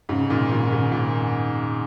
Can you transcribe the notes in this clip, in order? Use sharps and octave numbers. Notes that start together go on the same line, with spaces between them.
G#2 C#3
A#2 D#3
A#2 D#3
G#2 C#3
A#2